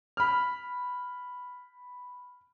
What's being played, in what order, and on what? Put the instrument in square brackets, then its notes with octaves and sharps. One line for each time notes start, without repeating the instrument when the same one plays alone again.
[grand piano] B5 F6